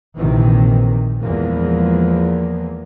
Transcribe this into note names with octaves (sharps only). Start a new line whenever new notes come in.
A#1 C3 D#3 E3
E2 F3 G#3 A#3